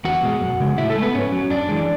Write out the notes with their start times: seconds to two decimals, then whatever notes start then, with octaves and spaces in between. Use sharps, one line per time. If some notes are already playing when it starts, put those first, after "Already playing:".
0.05 E2 F#4 F#5
0.23 B2 G#3
0.41 F#2
0.60 C#3 G#3
0.78 A2 E4 E5
0.90 A3 A4
0.96 G#3
1.02 B3 B4
1.14 G#2 C#4 C#5
1.32 F#3
1.50 F#2 D4 D5
1.69 E3 G#3